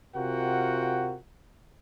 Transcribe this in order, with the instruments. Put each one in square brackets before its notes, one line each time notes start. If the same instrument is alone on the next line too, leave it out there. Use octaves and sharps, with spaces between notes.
[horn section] C3 F4 F#4 A#4 F#5 G5